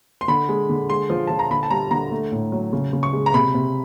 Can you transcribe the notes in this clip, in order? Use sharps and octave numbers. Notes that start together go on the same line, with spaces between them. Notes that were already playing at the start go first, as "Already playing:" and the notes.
C6
D3 B5
G#3
D3
G#3 C6
F3
F3 A5
A#5
D3 B5
A5
G3 A#5
D3 A#5
A3
A2
F#3
C#3
C#3
C#6
G#3
A#5
C3 B5
C3